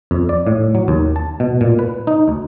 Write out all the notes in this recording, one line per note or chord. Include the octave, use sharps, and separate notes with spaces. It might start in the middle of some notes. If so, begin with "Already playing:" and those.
F2
D5
A2
F#3
D#2
A5
B2
A#2
B4
D#4
D2